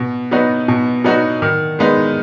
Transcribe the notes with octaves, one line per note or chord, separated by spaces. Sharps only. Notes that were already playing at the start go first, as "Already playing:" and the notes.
Already playing: B2
F#3 B3 D#4 F#4
B2
F#3 B3 D#4 F#4
D#3
G#3 B3 D#4